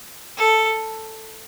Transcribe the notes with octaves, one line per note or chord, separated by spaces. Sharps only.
A4